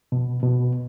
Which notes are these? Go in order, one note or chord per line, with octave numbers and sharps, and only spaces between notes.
B2
B2